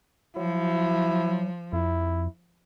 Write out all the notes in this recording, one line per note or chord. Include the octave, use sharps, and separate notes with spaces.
F3 F#3 E4
F2 E4